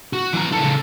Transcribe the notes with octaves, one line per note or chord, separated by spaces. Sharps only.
F#4
E3 A#5
C#3 A4